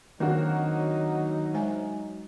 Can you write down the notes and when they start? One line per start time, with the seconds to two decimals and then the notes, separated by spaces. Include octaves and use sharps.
0.20 D#3 F#3 A#3 C4 D4 D#4 F#4 A#4
1.54 G#3 C5 G#5